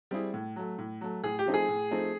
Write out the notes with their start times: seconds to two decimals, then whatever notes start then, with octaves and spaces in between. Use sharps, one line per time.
0.11 G3 C4 E4 G#4
0.34 A2
0.56 F#3 A3
0.78 A2
1.01 F#3 A3
1.23 A2 G#4
1.39 G4
1.46 F3 A3 C4 D#4
1.54 G#4
1.68 A2
1.91 F3 A3 C4 D#4